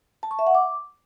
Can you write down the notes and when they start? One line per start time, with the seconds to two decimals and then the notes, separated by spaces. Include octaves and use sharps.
0.23 A5
0.31 C#6
0.39 E5
0.47 F#5
0.55 D6